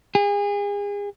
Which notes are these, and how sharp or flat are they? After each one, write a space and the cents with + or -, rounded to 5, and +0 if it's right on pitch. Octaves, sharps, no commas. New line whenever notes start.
G#4 -35